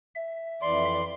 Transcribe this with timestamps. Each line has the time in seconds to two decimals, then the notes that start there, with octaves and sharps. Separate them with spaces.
0.15 E5
0.62 F2 E3 D5 C6